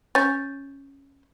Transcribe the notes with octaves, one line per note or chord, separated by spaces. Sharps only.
C#4 G6 A6